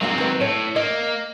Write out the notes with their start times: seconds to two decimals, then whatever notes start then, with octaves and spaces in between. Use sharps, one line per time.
0.01 F#3 G#3 A#3 C4 F#4
0.18 D#3 B4
0.41 A2 C#5
0.76 A#3 D#5